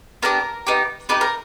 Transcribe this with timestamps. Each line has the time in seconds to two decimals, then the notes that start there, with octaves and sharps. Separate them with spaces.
0.22 B3 D4 G4 A#4
0.67 B3 D#4 G4
1.09 B3 D#4 G4 B4
1.21 A#4